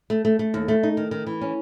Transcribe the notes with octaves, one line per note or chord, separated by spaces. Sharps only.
A3
A3
A3
D#2
A3
D#4
D#3
D#3
E3
C#4